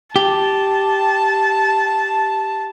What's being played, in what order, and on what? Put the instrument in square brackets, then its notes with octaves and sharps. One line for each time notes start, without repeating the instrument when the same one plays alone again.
[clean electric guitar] G4 [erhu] A5